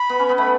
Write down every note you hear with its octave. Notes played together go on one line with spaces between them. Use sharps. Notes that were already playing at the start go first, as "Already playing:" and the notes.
Already playing: B5
B3
C#4
B3
A3 B5